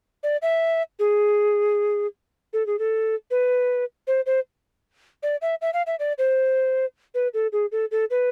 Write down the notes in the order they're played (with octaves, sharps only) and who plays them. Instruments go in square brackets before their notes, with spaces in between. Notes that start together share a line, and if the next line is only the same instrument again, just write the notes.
[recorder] D5
E5
G#4
A4
G#4
A4
B4
C5
C5
D5
E5
E5
F5
E5
D5
C5
B4
A4
G#4
A4
A4
B4